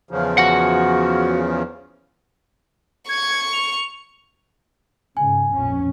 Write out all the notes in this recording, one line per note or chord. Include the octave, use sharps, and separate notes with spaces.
E2 C#3 F3
F#4 F#5
C#6 G#6 C#7
F7
G#2 C#3 G#5
A#1 F2 C#4